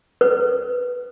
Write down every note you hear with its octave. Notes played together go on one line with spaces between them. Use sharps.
B4